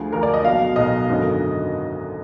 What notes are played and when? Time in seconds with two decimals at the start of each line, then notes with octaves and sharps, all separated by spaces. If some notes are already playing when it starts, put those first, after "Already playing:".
Already playing: D2 D3 F3 G#4
0.13 D2 D3 F3 A#4
0.23 D5
0.34 D#5
0.45 B1 B2 F#3 F5
0.76 B1 B2 F#3 D#5
1.09 G#1 F#2 D3 F#3